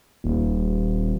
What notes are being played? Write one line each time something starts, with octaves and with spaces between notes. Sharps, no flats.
D#1